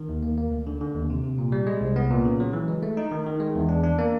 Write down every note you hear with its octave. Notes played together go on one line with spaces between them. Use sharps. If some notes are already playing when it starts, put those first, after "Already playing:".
Already playing: D#3
D#2
A#3
A#3
D2
D3
D3
D#2
C3
C3
A#2
G3
G#3
C2
B3
A#2
C#3
F#3
E3
G#3
A3
D#4
D#3
D#3
G#3
E2
D4
D4
A#3